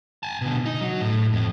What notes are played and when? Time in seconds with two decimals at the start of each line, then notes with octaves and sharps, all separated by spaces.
0.23 G#5 A5
0.41 B2 D3
0.66 D#4
0.81 F#3
1.00 A2
1.33 F2